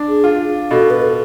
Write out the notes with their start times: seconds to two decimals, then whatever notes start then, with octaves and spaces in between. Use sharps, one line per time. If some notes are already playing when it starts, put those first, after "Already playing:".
Already playing: D4
0.08 G#4
0.24 F4
0.71 B2 A4
0.90 B4
1.01 A4